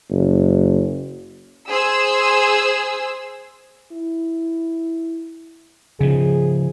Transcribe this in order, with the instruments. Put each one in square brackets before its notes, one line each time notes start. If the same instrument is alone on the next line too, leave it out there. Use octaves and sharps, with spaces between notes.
[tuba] F#1
[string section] G#4 C5 E6
[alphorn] E4
[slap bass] C#3 F3 [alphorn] G#4